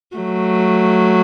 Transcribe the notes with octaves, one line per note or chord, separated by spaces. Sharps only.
F#3 A3